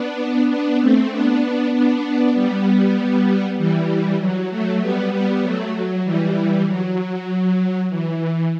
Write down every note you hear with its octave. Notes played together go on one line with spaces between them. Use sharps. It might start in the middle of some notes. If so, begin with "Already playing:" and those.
Already playing: B3 D4
B3 D4
A3 C4
B3 D4
B3 D4
G3 B3
E3 G3
F#3
F#3 A3
G3 B3
G3 B3
F#3 A3
F#3
E3 G3
F#3
E3